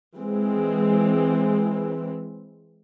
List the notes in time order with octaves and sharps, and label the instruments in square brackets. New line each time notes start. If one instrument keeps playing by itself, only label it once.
[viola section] E3 G#3 C4